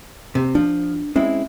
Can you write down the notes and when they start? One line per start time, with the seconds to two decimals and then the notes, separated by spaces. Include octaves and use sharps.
0.35 C3
0.55 F3 D4
1.16 G#3 C4 C#4 E4